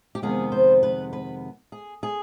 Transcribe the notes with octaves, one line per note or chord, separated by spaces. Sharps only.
G4
F2 C3 D#3 G#3 B3 G#4
C5
B4
B4
G#4
G#4